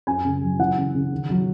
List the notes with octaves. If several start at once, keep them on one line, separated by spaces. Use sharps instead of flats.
F#2 G#5
C#3
F#3
E3 F#5
C#3
C#3
D#3
F#3